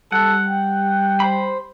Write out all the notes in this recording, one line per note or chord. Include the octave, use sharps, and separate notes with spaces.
G3 A4 F#5
G5
C5 B5